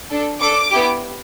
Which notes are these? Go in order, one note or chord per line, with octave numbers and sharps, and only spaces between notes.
D4 A4
D4 A4 D6
B3 E4 G4